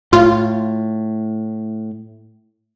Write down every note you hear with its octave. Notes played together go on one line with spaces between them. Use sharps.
A2 F4